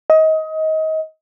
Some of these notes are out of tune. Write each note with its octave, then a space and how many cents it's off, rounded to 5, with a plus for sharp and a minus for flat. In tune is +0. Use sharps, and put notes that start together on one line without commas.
D#5 +25